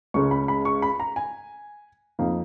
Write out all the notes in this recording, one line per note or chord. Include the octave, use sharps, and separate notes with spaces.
C#2 C#3 G#3 C#6
B5
B5
C#6
B5
A#5
G#5
F2 F3 A#3 D#4 F5